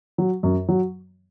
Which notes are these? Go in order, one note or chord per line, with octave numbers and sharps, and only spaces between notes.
F#3
F#2
F#3